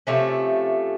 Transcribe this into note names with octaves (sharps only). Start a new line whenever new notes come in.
C3 F3 A3 C#4